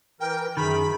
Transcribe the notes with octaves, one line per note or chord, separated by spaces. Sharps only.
E3 A#4 G5
F#2 D#3 G#4 B5